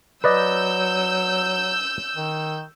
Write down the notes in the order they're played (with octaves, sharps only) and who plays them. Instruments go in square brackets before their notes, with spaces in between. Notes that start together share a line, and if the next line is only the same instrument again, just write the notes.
[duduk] F#3 [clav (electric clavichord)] B4 D5 D#5 [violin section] E6 G6
[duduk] D#3